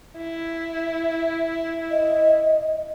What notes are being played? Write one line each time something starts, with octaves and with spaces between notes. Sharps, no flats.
E4
D#5